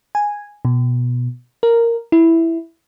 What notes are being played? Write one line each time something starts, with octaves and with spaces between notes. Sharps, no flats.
G#5
B2
A#4
E4